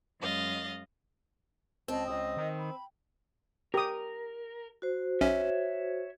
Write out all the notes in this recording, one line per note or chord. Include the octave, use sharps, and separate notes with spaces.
F#2 G#3 D#5 F5 A6
C#2 C4 D#5 A5
C#2 D#5 D#6
D#3
B5
G4 A#4 D#6
F#4 C5
B1 C#4 C#5 E5